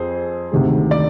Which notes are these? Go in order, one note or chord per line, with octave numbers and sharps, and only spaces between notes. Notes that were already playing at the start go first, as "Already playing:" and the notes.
Already playing: F2 G#4 C5
D2 C3 D#3 G#3
D5